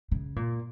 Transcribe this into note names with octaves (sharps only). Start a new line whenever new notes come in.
C#3
A#2